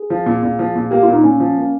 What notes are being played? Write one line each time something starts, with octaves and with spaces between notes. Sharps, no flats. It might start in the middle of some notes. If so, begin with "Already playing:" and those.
Already playing: G#4
F3
A#2
A#2
F3
A#2
A#3 G4
F4
A#2
D#4
A#2 C#4
F3
A#3